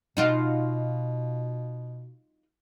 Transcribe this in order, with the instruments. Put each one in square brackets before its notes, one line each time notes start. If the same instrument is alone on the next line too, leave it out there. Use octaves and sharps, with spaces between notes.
[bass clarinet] B2 [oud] D#4 F4 F#4